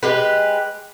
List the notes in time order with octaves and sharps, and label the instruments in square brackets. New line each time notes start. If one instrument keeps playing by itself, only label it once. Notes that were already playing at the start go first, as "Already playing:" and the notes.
[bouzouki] G#3 G4 B4